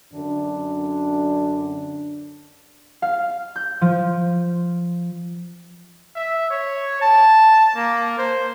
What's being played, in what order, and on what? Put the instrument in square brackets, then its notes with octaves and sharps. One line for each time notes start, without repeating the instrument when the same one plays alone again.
[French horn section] F#2 D3 D4
[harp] F5
G6
F3
[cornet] E5
C#5
A5
A#3
C5